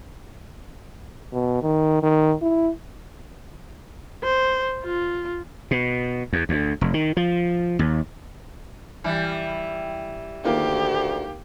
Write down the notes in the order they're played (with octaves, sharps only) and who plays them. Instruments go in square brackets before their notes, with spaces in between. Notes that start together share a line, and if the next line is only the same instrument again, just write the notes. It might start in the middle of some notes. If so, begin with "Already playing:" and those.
[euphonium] B2
D#3
D#3
E4
[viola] C5
F4
[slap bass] B2
E2
D2
F1
D#3
F3
D#2
[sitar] E3 G3
[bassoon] D2 [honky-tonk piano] D#3 A#3 F4 [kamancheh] G4